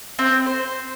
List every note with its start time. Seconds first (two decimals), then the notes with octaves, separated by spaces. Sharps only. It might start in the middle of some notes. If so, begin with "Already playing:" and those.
0.19 C4
0.46 C5